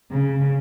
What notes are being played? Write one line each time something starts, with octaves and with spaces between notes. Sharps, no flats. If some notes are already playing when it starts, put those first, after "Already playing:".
C#3